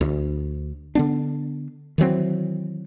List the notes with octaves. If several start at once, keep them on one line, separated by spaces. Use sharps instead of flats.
D2
D3 B3 D4
D#3 E3 F#3 C4